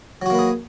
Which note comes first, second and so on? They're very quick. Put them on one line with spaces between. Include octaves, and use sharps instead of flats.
F#3 F#4 A#3 B4 G#4